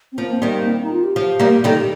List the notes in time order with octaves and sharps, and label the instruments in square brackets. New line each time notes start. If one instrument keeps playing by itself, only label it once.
[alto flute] C4
[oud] F3 [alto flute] A#3
[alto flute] C4
[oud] D#3 G3 [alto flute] A#3
[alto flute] C4
D#4
F4
G4
[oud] F3
G3 A#3
[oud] D#3 G3 [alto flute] A4
[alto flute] G4